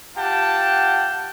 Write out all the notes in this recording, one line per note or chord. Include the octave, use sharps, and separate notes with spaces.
F4 G4 F#5 G5 A5